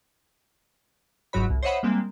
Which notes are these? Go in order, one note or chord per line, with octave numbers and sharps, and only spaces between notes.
G1 G#2 F#3 F#4 C#5 B5
C2
C5 C#5 D#5 E5 F#5 B5
G3 G#3 A#3 C4